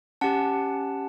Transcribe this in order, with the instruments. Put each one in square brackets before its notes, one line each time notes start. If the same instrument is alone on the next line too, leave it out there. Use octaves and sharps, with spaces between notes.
[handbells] C#4 G4 F#5 A5